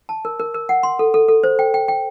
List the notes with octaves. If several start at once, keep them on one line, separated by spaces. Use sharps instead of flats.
A5
A#4
A#4
A#4
F#5
C6
A4
A4
A4
C5
G5
G5
G5